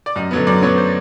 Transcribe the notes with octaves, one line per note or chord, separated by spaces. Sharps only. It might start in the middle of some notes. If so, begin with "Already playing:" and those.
D5
F#2 D#5
D3 F#3 B3
F#2 D5
D3 F#3 B3 C#5
C5